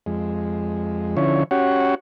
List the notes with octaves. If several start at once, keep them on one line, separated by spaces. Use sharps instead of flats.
F2 G#3
D3 F3 C#4 E4 C#5
C#4 F#4 G4 C#5 F#5